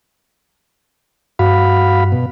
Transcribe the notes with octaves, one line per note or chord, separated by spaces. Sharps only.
G2 F#4 F5 B5
B2